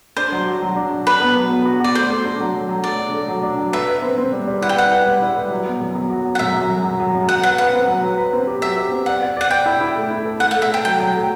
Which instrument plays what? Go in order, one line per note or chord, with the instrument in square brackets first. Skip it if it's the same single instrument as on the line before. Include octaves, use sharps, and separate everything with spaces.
[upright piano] D4 [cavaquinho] C5
[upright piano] F#3
F#4
F#3
D4
F#3
[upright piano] D4 [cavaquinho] B4
[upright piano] B3
F#3
F#3
F#4
[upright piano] F#4 [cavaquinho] D5
[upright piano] A3 [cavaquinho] C5
[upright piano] A3
D4
F#3
F#3
F#3
[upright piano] A3 [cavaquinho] D5
[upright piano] D4
A3
F#3
D4
F#3
[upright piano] B4 [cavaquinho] E5
[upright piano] B4
C4
C4
G3
G3
[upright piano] E4 [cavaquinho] F#5
[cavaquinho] G5
[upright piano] B4 [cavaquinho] F#5
[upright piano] B4
G3
E4
G3
F#3
B3
F#2
F#3
F#4
F#3
[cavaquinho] F#5
[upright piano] F#2 [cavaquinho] E5
[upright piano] F#3
F#2
F#3
F#3
F#2
[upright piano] F#3 [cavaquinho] F#5
[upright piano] B4 [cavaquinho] F#5
[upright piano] B4 [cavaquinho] F#5
[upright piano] C4
F#3
F#3
B4
C4
G4
[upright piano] F#3 [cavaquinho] E5
[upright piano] G4
C4
[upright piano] D5 [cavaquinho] F#5
[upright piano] D5
[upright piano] D5 [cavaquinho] F#5
[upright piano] D5 [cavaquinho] G5
[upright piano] E4
E4
A3
E4
A4
[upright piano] A3 [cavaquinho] F#5
[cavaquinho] F#5
[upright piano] A3
[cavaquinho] E5
[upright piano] A4 [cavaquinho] G5
[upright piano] F#3 [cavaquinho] G5
[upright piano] F#3
A3